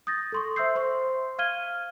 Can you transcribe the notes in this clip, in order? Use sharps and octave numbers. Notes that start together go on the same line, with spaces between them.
D#6 G6 A6 A#6
A4 C6 C#6
C5 E5 C6 E6 G6 C7
C5 C6 C#6
F5 F6 G#6 D#7 G7